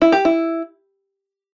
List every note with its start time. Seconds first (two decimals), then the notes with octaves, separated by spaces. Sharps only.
0.02 E4
0.12 G4
0.25 E4